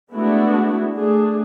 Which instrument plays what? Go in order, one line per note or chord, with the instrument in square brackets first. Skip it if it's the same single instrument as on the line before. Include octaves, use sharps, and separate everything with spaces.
[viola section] G#3 A3 B3 D4 E4 F#4
A3 D4 G#4